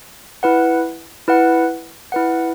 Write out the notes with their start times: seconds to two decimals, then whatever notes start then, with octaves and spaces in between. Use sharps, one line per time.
0.43 E4 B4 F#5
1.28 E4 B4 F#5
2.12 E4 B4 F#5